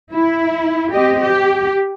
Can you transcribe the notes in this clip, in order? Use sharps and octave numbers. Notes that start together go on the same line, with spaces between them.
E4
C4 G4 D#5
G4